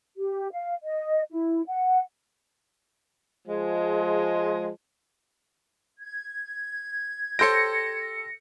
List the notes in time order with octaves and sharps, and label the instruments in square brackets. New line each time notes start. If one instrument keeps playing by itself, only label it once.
[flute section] G4
F5
D#5
E4
F#5
[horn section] F3 G#3
[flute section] G#6
[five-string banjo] G4 C5 C#5 [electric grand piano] A4 G6 D7 [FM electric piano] A#6 C#7